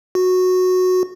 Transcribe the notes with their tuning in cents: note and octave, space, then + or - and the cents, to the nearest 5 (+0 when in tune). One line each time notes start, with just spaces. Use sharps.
F#4 -10